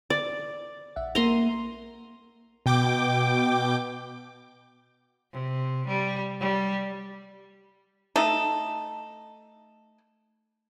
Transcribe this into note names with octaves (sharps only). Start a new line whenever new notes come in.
D5
A#1 E5 F#5
A#3 A#4 A#5 C6 D#7
B2 G5 D6
C3
G3
G3
A3 D#4 A4